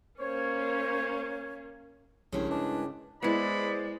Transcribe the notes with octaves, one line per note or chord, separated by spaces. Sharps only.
A#3 C#4 C5 C#5
B1 G2 C#3 F3 G#3 E4 G4 A#4
D4 B4 D#5 G#5
G#3 B3 E4 G#4 C5 D5 B5